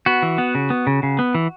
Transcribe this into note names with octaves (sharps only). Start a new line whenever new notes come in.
B3 F#4
E3
B3
C#3
B3
C#3
C#3
B3
E3